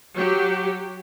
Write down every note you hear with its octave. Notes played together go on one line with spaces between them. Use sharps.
F#3 G4